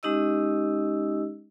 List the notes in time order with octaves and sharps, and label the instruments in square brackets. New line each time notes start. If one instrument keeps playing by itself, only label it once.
[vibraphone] G#3 C#4 D#4 G4 D#5 E6